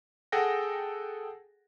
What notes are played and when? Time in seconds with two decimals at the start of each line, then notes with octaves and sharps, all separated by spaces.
0.32 G#4 A4 F#5 G5 A#6